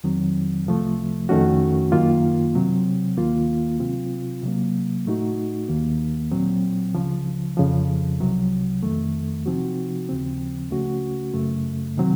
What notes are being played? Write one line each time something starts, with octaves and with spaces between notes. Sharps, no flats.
F2 D#3 F#3 C4
C2 C3 F3 A3
F2 D#3 A3 C#4 F#4
F#2 D#3 A#3 F4
C3 F#3 C4
D#2 D#3 A#3 F4
C3 F#3 C4 F4
C3 F#3 A#3
A2 A3 D#4 F#4
D#2 D#3 A#3
A#2 F#3 C4
C#2 C#3 F3
F2 C#3 F3
C2 C3 F#3
F2 D#3 A3
C3 F3 C4 D#4 F#4
D#2 C#3 F3 C4
C#2 C#3 A3 C#4 F#4
F#2 C#3 A3
C3 D#3 F#3 C4